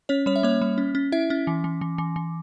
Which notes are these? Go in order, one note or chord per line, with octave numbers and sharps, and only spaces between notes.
C#4 C#5
G3 C#5
E5
A#3 C#5
G3
C#4
C#4
E4 E5
C#4
E3
E3
E3
E3
E3